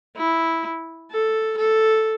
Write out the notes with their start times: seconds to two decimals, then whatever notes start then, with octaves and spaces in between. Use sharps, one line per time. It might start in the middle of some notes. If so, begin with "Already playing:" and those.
0.16 E4
1.11 A4
1.58 A4